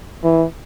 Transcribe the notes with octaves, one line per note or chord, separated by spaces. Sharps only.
E3